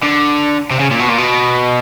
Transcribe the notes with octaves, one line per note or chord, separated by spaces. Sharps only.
D3
C3
C#3
A#2
B2
A#2
B2